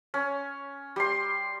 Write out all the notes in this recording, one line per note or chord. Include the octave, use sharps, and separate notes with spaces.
C#4
G3 C6